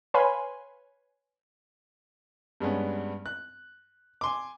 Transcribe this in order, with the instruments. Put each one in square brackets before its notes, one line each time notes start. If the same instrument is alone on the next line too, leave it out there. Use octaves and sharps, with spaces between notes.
[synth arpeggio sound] B4 C#5 F5 G#5 B5 C6
[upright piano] G2 G3 G#3 B3 C#4
F#6
G#5 C6 D6